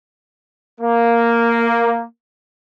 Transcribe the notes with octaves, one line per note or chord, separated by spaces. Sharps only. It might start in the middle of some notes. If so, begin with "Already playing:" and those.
A#3